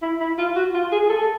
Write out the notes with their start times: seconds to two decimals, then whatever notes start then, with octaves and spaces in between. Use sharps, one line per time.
0.02 E4
0.20 E4
0.38 F4
0.55 F#4
0.74 F4
0.92 G#4
1.03 G#4
1.09 A4
1.20 A4